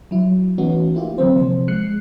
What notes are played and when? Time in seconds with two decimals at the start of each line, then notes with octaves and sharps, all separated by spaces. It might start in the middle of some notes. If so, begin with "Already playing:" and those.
0.11 F#3 E4
0.58 E3 A3 B3 C#4 D#4 F#4
0.95 A#3 E4 F4 G4
1.18 D3 F#3 A#3 C4 C5
1.36 C3 F3 C5
1.68 G#3 F#6 C7 C#7